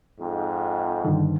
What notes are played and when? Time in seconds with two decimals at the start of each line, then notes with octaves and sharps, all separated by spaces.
0.20 F2 G#2
1.05 G2 D3 D#3